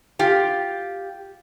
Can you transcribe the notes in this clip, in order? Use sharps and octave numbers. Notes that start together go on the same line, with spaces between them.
F4 G4